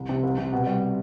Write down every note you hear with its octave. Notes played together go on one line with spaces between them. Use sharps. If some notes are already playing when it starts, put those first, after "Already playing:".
Already playing: C2
C3
C2
C3
B2
G3